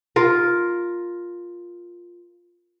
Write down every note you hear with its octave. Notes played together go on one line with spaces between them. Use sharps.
F4 A#4